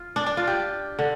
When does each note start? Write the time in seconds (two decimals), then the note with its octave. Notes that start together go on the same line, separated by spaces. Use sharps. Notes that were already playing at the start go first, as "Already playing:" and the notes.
Already playing: F4
0.16 D4
0.26 D4
0.37 F4
0.47 G4
0.99 D3